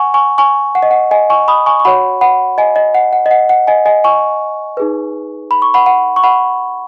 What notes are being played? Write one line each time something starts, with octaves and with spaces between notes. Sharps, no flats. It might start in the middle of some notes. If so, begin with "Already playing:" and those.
Already playing: F#5 G#5 C#6
G#5 C#6
G#5 C#6
F#5
D#5
F#5
D#5 G#5
G#5 C#6
B5 D#6
G#5 C#6
C#6
F#4 C#5 F#5 B5
F#5 B5
D#5 G#5
D#5
F#5
F#5
D#5
F#5
F#5
D#5 G#5
D#5 G#5
G#5 C#6
D#4 G#4 B4
B5
C#6
F#5 B5
F#5
C#6
F#5 B5